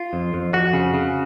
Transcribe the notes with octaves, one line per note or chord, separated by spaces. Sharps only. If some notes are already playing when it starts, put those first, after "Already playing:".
Already playing: F4
F2
F2
F2 F#4
C#3
C#3